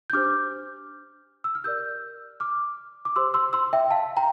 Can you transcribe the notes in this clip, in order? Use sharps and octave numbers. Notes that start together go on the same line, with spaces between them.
G6
D4 G4 C5 D6 F6
E6
F6
G4 A#4 D5 E6 G6
D6 F6
D6
G4 C5 C6 E6
C6 E6
C6 E6
E5 G5
F5 A5
G5 A#5